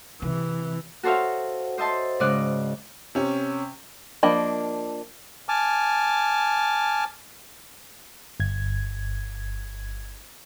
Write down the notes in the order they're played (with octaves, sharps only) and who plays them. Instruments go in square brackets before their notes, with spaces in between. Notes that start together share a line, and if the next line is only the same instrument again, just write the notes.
[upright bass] C3 [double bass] E3
[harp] F#4 A4 C5 C#5 E5 F5
C5 D#5 E5 A5 C6
G#2 C#3 D5 D#5 F#6
[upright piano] C3 C#4
[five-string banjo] F3 A#3 D4 D#5 B5
[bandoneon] G#5 A5 D6 F6
[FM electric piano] G1 G#6